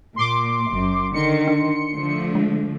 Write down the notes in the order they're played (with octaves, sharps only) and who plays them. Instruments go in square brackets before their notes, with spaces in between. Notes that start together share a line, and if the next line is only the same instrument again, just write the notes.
[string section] A#2 [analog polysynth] C6 D6
[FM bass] F#1 [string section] F#2
[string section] D3 D#3 [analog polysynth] C6 C#7
[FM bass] D4
[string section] D3 F3 A3
[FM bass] G#3